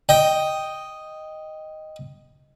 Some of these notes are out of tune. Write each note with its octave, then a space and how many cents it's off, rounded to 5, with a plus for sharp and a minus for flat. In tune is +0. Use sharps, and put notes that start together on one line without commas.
D#5 +0 G5 +0